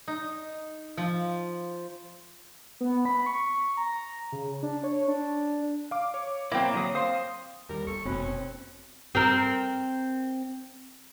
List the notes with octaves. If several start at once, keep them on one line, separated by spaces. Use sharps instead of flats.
D#4
F3
B3
B5
C#6
A#5
C#3
D4
C#5
D4
F5 D6
C#5
F#3 A#3 C4 E4
D3 F#3 D#6
C5 F5 C6 D#6
D#2 G3 A#4
G1 A4 C#6
F1 B2 C4 C#4 B5 F#6
C4 A#4